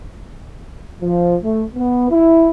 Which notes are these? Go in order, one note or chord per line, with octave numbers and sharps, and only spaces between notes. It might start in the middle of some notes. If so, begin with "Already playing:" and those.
F3
A3
B3
E4